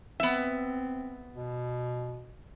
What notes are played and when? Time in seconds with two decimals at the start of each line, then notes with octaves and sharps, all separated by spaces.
0.20 B3 C4 E5
1.34 B2